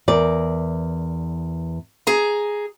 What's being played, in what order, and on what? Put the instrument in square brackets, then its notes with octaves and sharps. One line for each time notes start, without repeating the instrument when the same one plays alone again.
[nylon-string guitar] E2 A#4 D5
[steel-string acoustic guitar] G#4 A#5